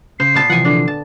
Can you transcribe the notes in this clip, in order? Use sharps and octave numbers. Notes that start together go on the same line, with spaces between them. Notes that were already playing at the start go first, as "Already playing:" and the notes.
C#3 C5 C7
A#2 B3 A5
C3 E3 F3 F#5 G#5
D3 D4
A5